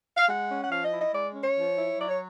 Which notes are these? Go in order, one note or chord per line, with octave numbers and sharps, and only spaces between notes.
F5
G#3 F#5
C#4
F#5
F3 F5
D#5
E4
D#5
G#3 D5
C#4
C#5
F3
E4
F#3 D5
C#5